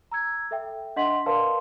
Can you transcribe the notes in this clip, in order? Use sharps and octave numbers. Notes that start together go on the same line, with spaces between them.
A#5 E6 G#6
A4 E5 G5
D4 D#5 F#5 C6 B6 F#7
A#4 B4 D5 F5 A5 C6